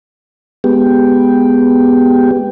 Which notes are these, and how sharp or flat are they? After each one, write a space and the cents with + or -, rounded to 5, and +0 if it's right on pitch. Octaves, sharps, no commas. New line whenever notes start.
G#3 +0 B3 +0 G4 +0